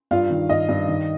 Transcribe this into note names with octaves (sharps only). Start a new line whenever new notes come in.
G2 F4 F5
D#3
G2 D#5
G2
D#3